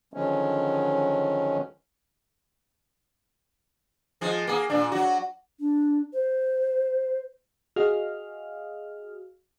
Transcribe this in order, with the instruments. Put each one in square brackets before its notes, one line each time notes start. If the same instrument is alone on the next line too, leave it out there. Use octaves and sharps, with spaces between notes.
[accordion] D3 D#3 F3 F#3 G#3 C#4
[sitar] F3 G#3
A#3 G#4
A#2 D4
F#3 F#4
[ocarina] D4
C5
[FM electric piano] F#4 G#4 D#5 F5 F6